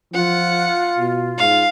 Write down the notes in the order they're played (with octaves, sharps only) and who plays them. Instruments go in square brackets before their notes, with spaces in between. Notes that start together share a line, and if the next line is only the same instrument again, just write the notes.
[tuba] F3 [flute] F4 [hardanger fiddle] F#5
[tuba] B2
[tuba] G#2 [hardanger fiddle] F5